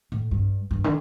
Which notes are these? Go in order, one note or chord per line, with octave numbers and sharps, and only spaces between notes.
A2
G2
G2
D3